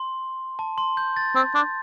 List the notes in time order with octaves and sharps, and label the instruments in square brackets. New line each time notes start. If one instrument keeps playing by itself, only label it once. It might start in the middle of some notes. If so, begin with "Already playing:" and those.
Already playing: [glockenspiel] C6
A5
C6
G6
A6
[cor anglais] C4
D4